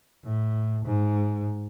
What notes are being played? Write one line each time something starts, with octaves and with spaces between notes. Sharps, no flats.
A2
G#2